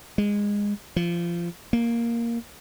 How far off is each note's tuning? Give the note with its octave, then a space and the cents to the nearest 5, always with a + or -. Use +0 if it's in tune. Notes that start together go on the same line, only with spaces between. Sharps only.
G#3 -20
F3 -25
A#3 +0